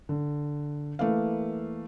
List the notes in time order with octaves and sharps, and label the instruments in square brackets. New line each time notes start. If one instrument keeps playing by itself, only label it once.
[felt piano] D3
E3 A3 A#3 B4 F5